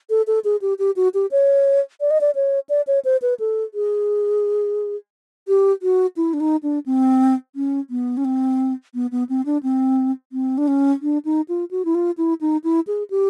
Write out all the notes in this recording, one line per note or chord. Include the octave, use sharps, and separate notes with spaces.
A4
A4
G#4
G4
G4
F#4
G4
C#5
D5
D#5
D5
C#5
D5
C#5
C5
B4
A4
G#4
G4
F#4
E4
D4
D#4
D4
C4
C#4
B3
C#4
C4
B3
B3
C4
D4
C4
C4
D4
C#4
D4
D#4
F4
F#4
E4
F4
E4
D#4
E4
G#4
G4